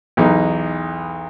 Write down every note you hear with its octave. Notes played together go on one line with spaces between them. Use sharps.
B1 E2 D#4